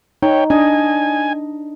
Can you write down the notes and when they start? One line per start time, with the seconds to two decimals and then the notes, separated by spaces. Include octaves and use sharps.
0.23 D#4 C#5 G5
0.50 D4 D#5 G#5